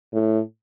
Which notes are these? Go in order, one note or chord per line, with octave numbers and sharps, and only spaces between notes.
A2